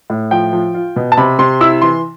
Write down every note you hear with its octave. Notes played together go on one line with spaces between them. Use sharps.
A2
F3 G5
F3
F4
B2
A5
C3 B5
C3 C6
E4 E6
E3 C6